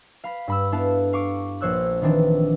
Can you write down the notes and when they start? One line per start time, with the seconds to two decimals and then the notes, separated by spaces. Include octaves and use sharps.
0.24 F5 B5 B6
0.48 G2 B5 E6
0.72 B3 D4 E4 A4 F5 A5
1.13 F5 C#6 D6
1.61 A#1 C5 C#5 E6 F#6
2.01 D#3 E3 C4 D4